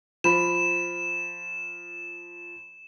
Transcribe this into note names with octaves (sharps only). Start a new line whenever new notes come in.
F3 B5 E7